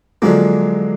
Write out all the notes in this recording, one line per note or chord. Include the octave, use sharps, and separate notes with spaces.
D3 F3 F#3 G#3 A#3